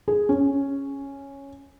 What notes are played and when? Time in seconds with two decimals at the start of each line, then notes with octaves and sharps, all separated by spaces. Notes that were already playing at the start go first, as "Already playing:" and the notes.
0.08 G#4
0.29 C#4